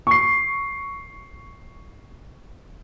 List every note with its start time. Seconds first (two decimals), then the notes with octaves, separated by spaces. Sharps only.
0.07 C#6 C7